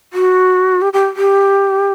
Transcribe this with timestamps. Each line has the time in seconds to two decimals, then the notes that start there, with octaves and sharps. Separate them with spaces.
0.13 F#4
0.82 G4
0.93 G4
1.16 G4